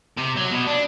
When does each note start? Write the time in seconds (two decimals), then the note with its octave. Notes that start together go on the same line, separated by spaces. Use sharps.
0.18 C3
0.37 F#3
0.52 B2
0.67 D4